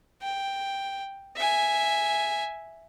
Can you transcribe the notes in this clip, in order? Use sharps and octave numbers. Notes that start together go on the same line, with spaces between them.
G5
E5 G#5